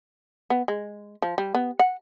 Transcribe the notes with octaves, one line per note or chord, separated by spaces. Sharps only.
B3
G#3
F3
G3
B3
F#5